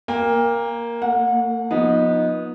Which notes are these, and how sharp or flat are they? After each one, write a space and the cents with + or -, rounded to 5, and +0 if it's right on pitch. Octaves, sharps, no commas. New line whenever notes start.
A#3 +5 A#4 +10 G5 +40
A#3 -45 F#5 -35
F3 +25 B3 -20 D#4 +0